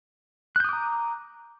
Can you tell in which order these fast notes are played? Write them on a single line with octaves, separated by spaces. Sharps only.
F#6 G6 D#6 D6 A#5